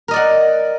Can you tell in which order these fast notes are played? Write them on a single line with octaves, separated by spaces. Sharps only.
A#4 D#5 D5 F#5